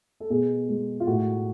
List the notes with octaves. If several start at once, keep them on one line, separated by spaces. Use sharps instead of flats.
A4
B2 G#4
G#3
F4
A2 F#4